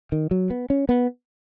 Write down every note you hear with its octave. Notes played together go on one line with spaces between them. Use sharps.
D#3
F#3
B3
C#4
B3